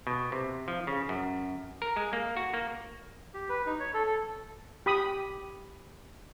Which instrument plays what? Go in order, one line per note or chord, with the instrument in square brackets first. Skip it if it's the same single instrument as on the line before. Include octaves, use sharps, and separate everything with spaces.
[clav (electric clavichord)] B2
C3
F3
C#3
F#2
A#4
G#3
A#3
F#4
A#3
[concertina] G4
B4
D#4
C#5
A4
A4
[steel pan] G4 B5 D#6